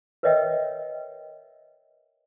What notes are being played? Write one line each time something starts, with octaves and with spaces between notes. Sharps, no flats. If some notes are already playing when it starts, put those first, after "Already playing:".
A#4 B4 C#5 D#5 E5 G5